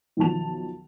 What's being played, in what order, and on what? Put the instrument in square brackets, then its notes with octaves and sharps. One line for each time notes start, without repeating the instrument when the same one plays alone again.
[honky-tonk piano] B1 D#3 F3 A5 F7